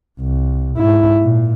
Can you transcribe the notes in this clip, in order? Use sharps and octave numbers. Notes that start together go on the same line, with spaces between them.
C2
G#2 E4
A#2